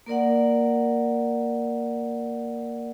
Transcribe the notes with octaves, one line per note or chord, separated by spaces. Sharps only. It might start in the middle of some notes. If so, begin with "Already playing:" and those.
A#3 A#4 D5 F#5